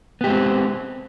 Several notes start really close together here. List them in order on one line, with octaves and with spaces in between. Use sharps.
B3 G4 G#3 C4